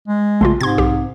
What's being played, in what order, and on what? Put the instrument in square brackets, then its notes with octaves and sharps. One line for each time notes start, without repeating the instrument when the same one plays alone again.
[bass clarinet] G#3
[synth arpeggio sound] A#1 C#3 F4 [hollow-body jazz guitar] A3 C6
[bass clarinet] G#2 [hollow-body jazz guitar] C3 [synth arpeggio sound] C6 G#6
[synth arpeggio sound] B1 G4